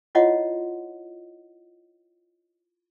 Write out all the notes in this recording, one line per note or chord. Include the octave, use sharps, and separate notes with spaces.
E4 F4 C#5 D#5 F#5 C6